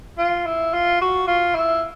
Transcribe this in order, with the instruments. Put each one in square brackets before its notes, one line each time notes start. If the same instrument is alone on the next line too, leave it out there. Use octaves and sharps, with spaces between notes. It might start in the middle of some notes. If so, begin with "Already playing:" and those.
[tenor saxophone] F4
E4
F4
F#4
F4
E4